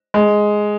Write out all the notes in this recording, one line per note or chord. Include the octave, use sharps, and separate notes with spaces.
G#3